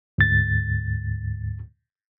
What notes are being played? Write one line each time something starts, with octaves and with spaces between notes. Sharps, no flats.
D2 G#2 A6